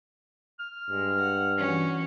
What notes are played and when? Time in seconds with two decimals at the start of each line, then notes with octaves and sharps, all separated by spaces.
0.59 F6
0.89 G2 G#3
1.19 F#5
1.56 E3 C#4 F#4